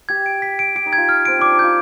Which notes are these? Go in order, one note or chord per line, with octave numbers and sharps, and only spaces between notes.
G4 G#6
D7
B6
D7
G4 D7
D#4
G#6
F4
F6
C4 D7
D4 D6
D#4
F4 G6